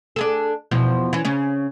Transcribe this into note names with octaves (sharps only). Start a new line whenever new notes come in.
D4 G#4 A4
E2 B2 F3
E3 C#4
C#3 C#4